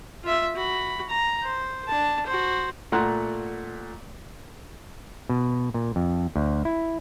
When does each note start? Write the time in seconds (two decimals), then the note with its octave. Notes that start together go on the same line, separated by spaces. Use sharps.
0.24 F4 E5
0.55 F#4 B5
1.09 A#5
1.42 C5
1.88 D4 A5
2.26 F#4 C5
2.92 A#2 A3 F#5 A#5 C6 F#6
5.29 B2
5.74 A#2
5.96 F2
6.36 D2
6.65 E4